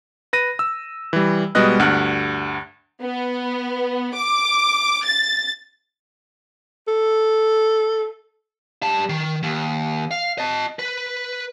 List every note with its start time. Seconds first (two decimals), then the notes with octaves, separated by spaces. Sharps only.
0.33 B4 A#6 D#7
0.59 E6
1.13 E3 G3
1.55 B2 G3 G#3 B3 D#5 F#6
1.80 D2 G2 F#5 F6 F#6
3.03 B3
4.15 D6
5.04 A6
6.88 A4
8.82 G3 A5
9.09 D#3
9.43 D#2
10.11 F5
10.38 D#5 A5
10.79 B4